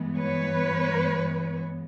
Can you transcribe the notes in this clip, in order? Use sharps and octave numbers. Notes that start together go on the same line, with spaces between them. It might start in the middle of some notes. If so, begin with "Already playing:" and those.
Already playing: G2 E3 G#3 B3
B4 C#5